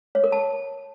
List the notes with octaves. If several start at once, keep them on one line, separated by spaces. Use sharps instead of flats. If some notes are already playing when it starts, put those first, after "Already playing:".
C#5
A#4
A5